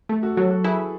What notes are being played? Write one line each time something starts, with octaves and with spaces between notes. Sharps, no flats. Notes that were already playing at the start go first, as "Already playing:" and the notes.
A3
F#4 A4
F#3 F#4 A4
F#4 A4
E4 G#4 B4